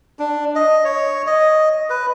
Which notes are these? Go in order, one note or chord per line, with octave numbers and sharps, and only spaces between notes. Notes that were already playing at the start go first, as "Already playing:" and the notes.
D4
D#5
C#5
D#5
B4